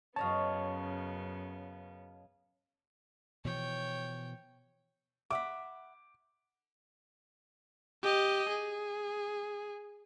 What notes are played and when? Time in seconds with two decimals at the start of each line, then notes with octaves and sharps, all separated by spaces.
0.16 F#2 C#3 B3 C#5 D#5 F5 A5
3.45 B2 E3 F3 C#5 G5
5.31 E5 F#5 B5 D6
8.03 G4 D#5
8.49 G#4